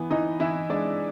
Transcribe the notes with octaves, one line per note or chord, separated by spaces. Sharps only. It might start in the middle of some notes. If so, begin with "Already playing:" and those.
Already playing: E3 B3
E3 D#4 D#5
E3 E4 E5
G#3 D4 D5